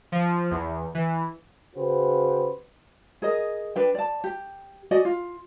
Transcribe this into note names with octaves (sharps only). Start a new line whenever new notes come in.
F3
E2
E3
C#3 F#4 G4 B4 C5
G#4 A#4 D#5
D4 B4 G5
D5 A5
G4
F#4 D5 D#5 G#5
F4